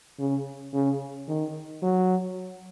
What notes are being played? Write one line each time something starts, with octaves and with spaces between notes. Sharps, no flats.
C#3
C#3
D#3
F#3